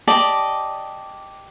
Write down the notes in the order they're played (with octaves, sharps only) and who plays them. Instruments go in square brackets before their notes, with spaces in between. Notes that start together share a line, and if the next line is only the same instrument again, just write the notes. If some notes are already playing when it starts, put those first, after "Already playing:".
[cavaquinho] G4 D5 D#5 A5